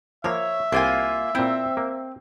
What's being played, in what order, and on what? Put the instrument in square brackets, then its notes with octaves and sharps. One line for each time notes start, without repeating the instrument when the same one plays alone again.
[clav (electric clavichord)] F3 A#3 [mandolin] C#5 [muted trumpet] E5
[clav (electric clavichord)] C2 [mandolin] A#3 F4 G#5
[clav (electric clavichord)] A#2 E4 [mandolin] C4
[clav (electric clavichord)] A#3